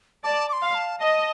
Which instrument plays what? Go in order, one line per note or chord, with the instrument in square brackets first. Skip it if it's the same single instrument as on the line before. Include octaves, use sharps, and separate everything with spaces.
[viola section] D5 [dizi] A5
[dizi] D6
C6
[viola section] F5
[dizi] A5
[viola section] D#5 [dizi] A5